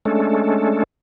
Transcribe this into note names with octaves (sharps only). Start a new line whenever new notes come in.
G#3 A3 C#4 D4 A4